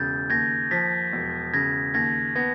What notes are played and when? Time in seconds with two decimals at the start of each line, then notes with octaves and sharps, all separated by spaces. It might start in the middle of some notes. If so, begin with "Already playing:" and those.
Already playing: E1 C#3 G6 A6
0.30 D#2 G#6 A#6
0.71 F3 A6 B6
1.12 E1
1.54 C#3 G#6 A#6
1.94 D#2 G#6 A#6
2.35 B3 G#6 A#6